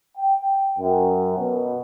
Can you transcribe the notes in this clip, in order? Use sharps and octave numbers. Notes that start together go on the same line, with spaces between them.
G5
F#2
B2